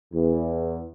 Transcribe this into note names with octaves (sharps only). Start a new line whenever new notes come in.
E2